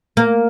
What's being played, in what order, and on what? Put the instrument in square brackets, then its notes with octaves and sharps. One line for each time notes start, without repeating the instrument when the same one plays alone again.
[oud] A#3